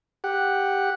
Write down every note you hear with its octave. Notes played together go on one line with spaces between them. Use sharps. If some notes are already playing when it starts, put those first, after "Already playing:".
G4 F#5